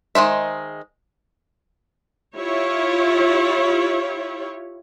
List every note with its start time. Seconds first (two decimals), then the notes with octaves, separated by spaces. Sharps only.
0.15 D#3 G#3 C5 E5
2.36 E4 F4 G4 C#5